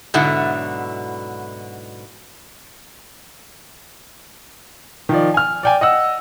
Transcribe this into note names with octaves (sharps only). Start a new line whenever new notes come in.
G#2 B2 D3 F#3 E4
D#3 F3 D5
G#5 F6
D5 G5 G#5
D#5 F#5 E6